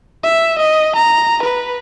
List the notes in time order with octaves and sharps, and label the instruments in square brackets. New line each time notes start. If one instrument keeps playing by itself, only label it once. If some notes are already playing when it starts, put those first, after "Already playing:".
[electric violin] E5
D#5
A#5
B4